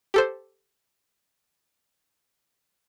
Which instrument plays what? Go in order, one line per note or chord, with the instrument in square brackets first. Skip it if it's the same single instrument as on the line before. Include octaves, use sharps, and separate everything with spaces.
[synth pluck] G4 A4 C5